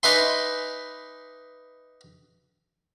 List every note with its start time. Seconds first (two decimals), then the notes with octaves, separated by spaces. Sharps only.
0.03 D#4 B4 D5 E5 G#5 C6